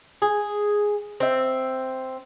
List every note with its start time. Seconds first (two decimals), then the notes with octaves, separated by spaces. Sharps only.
0.22 G#4
1.20 C4 E5